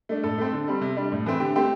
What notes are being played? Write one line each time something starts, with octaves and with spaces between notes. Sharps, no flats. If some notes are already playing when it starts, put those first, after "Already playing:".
A3 D4
A2 A4
A3 C4
D3
G3 C4
C3
G3 D4
A2
E3 A3 C4
D3 G4
A3 C4 G4